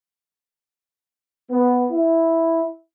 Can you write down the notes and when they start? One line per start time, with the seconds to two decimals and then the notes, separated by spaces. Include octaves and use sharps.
1.51 B3
1.91 E4